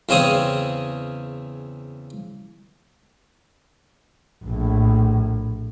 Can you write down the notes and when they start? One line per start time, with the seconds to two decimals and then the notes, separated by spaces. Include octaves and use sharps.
0.09 E2 C#3 C4 C#4 G#4 D#6
4.45 A#1 A2